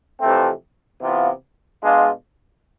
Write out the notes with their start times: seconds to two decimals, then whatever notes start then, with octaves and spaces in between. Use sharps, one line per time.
0.20 F2 C3 E3 A3 C4
1.01 C3 E3 B3 F4
1.80 B2 G#3 D4 F4